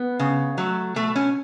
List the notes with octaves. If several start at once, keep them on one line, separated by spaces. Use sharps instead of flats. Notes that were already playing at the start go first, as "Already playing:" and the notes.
Already playing: B3
C#3
F#3 A3
B2 A3
C#4